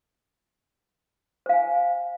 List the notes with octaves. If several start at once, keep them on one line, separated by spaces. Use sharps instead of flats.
C5 F5 G#5